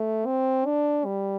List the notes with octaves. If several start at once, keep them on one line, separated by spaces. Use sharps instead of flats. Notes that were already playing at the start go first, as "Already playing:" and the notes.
Already playing: A3
C4
D4
G3